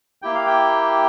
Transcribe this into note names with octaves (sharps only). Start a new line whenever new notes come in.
A#3 E4 G4 G5
F5
G5